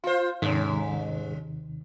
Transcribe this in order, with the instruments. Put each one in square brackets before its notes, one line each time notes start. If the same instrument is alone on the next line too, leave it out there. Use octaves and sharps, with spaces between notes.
[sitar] F4 C5 [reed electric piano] F5
[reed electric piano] D#2 C3 D#3 [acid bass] G#2 [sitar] G3 C#4